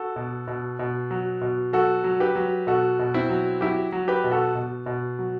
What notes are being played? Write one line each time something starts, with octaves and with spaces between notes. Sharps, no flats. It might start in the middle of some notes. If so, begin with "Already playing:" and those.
Already playing: F#4 A4
B2
B2
B2
F#3
B2
F#3 F#4 A4
F#3
G4 B4
F#3
B2 F#4 A4
B2
C4 E4
F#3
F#3 E4 G4
F#3
G4 B4
B2
F#4 A4
B2
B2
F#3